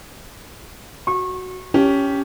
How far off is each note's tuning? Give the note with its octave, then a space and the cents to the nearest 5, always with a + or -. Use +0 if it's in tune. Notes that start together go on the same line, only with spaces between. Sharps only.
F#4 +0 C#6 -30
C#4 +10 G4 +0 A5 +0